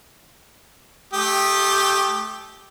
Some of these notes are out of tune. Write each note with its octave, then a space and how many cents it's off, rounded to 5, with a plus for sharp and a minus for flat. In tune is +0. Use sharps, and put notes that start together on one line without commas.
A3 -25 G4 +0 D#6 -30